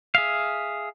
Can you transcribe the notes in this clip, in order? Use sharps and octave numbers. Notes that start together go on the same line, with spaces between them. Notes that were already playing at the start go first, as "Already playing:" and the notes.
G#4 E5 F5